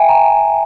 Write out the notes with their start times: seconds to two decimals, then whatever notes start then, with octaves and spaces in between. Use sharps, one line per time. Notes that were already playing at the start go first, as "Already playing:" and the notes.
Already playing: E5 G5 G#5
0.09 A#5